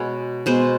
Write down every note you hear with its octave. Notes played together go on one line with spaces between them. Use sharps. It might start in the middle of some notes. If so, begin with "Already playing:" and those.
Already playing: B2 G#3 B3 C#5
B2 G#3 B3 C5